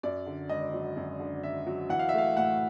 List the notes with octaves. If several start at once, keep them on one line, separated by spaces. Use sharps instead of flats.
F#2 D5
D3
G#1 D#5
F#3
F#2
D3
G#1 E5
F#3
E3 F#5
F5
E5
A3 F5
A2 F#5